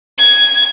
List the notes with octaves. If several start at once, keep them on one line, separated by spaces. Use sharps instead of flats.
G#6